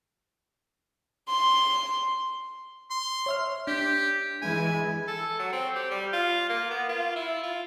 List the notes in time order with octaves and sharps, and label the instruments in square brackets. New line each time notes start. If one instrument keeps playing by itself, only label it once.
[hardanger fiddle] C6
[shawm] C6
[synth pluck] C#5 E5 F6
[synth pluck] D4 G6 B6 [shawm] G4
[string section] E3 G#3 E4 [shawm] G#5
[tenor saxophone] A4
F#3
C4
G4
G3
F4
A#3
B3
F4
E4
F4